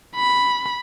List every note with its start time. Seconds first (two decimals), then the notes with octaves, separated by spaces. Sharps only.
0.16 B5